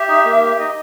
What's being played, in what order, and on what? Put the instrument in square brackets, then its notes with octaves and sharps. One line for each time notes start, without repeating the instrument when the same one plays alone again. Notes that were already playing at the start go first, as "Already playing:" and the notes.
Already playing: [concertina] G4 [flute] E5
[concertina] D#4
A#3
G4
[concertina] D#4 [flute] D#5